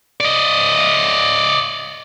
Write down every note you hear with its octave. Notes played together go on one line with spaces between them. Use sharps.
D5 D#5